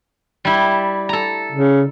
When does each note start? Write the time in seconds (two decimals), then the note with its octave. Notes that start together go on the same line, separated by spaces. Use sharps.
0.45 G3 E4
1.09 A4 A#5
1.52 C#3